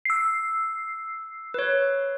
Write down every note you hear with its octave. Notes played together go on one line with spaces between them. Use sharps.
E6 C7
B4 C#5